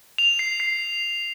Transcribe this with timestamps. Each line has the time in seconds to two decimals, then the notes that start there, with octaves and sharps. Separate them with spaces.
0.18 F7
0.39 C7
0.60 C7